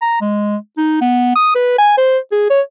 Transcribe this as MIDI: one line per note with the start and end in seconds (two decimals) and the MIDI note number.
0.02 0.19 82
0.21 0.57 56
0.78 0.97 63
1.01 1.33 59
1.36 1.54 87
1.55 1.77 71
1.79 1.94 80
1.98 2.18 72
2.32 2.50 68
2.50 2.61 73